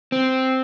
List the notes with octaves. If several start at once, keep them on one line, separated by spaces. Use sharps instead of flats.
C4